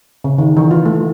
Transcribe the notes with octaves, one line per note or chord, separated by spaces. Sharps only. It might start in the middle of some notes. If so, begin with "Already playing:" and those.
C#3
D#3
E3
F4
A3